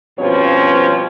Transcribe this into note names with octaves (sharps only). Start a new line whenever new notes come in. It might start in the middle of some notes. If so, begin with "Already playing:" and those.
G2 B2 F3 C4 C#4 C#5